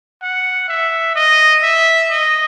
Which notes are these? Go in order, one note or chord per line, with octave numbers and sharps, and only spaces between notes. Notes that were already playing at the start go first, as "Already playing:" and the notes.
F#5
E5
D#5
E5
D#5